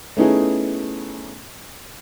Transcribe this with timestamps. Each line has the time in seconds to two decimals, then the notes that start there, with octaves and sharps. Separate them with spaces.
0.17 A3 B3 C#4 D#4 E4 G#4